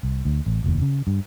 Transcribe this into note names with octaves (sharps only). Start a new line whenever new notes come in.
C2
D2
A1
F1 D#2
C#3
G2